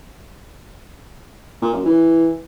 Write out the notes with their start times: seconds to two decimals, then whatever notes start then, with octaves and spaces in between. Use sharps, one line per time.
1.62 A#2
1.74 F#2
1.85 E3